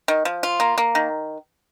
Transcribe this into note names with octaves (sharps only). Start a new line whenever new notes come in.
D#3
F3
F4
A#3
A#3
D#3